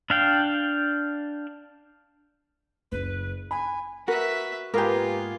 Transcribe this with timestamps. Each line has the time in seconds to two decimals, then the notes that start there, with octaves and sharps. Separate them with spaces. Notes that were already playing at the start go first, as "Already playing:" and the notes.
0.10 D4 F5 G5
2.92 F#1 B4
3.51 G#5 B5
4.08 F#4 A#4 B4 E5
4.74 G#2 A#3 B3 F4 G4 A#4 G#5